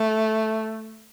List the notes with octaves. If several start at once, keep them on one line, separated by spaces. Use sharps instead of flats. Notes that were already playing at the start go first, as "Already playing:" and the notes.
Already playing: A3